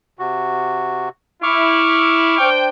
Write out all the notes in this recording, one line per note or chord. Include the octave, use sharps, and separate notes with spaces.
C3 F#4
E4 C#6 D6 F6
D4 C5 G5